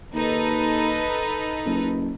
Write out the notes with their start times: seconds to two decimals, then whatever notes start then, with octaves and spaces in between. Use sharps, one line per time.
0.14 D#2 D#4 A4 B4
1.66 F#1